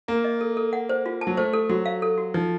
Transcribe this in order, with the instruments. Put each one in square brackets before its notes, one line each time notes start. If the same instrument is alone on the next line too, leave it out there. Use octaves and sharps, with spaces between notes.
[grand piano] A#3 [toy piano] A#5
[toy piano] D#5
A4
A4
F#5
C5
F4
A5
[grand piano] F#3
[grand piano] A3 [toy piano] C5
[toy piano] A4
[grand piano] F#3 [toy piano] F#4
[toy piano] F5
A4
F#4
[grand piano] F3 [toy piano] D#4